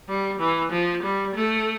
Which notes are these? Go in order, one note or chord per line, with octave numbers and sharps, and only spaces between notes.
G3
E3
F3
G3
A3